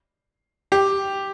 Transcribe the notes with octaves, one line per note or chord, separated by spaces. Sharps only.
G4